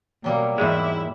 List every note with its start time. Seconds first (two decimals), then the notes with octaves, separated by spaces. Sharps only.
0.24 B2 F#3 G3 A#3
0.58 E2 G#2 G#3 E4